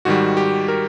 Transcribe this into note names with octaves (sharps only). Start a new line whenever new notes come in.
G#2 D#3 G3 F#4
G4
A#4